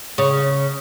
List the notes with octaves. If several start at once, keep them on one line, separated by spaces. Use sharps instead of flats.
C#3